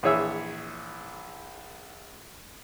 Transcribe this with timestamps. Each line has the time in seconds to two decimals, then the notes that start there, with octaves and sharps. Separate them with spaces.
0.03 A#1 E3 G#4 C#5 E5 E6